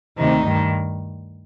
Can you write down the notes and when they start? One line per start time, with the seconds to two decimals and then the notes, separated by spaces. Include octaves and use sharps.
0.16 D2 C3 D#3 D#4
0.45 G2 D#3